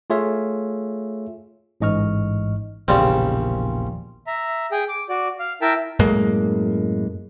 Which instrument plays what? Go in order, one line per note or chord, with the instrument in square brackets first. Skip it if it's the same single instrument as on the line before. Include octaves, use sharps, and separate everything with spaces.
[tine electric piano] A3 F4 G#4 C#5 E5 F5
A1 G#2 D#5 C#6 F6
[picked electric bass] E1 A#1 [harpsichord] C#3 G3 C4
[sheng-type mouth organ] E5 A#5
G#4 G5
D6
F#4 D5
F5
E4 A#4 E5 G5 A5
[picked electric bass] F#2 A2 G#3 A#3